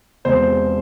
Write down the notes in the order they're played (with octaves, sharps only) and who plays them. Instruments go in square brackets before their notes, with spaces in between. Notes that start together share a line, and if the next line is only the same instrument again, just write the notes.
[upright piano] E1 E2 C3 C5